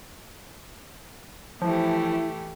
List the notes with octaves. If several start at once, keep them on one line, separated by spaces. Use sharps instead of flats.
E3 F3 A3 E4 G4